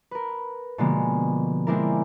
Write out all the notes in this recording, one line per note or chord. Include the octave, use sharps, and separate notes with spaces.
A#4 B4
B2 D3 F3 G#3 A#3 B3
G#3 A#3 C4 D4 E4 A#4